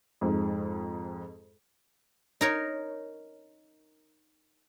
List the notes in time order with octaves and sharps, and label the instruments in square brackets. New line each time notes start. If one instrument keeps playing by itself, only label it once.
[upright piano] F2 G#2
[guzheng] D#4 A#4 C#5